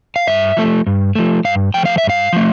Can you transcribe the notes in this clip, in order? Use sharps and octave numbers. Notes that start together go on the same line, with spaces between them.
F5
G2 E5
F3 A3
G2
F3 A3
G2 F5
F3 A3 G5
F5
E5
G2
F5
F3 A3